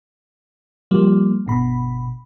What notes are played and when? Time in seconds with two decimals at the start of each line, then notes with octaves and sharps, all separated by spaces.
0.91 F3 G3 A#3
1.46 G1 B2 B5